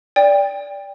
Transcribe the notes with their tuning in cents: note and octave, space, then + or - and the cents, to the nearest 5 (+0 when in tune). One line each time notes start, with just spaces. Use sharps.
D5 -15 G5 +20